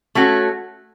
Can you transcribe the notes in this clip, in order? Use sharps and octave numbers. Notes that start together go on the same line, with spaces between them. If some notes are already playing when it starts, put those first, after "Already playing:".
A3 C#4 F#4